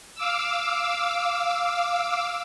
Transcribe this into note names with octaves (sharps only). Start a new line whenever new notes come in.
F5 D6 E6